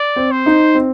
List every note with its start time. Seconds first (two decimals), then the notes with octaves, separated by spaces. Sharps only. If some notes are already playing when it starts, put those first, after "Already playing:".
Already playing: D5
0.16 C4
0.31 C5
0.46 D#4
0.75 C4